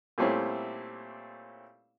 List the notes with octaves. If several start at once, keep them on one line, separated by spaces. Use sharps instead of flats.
A#2 G3 A3 C4 C#4 E4